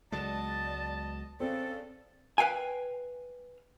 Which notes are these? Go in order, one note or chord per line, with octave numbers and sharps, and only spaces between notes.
C#2 F#3 G#3 B3 D5 D#5 A5
C#3 C4 A4 D5
B4 F5 G5 G#5